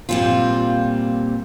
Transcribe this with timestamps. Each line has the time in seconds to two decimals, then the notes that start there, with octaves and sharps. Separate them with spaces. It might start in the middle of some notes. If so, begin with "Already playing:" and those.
0.09 A#2 G3 C4 F4